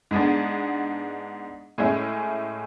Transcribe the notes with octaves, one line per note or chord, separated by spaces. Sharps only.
G#2 G#3 B3 D4
A2 G#3 C#4 E4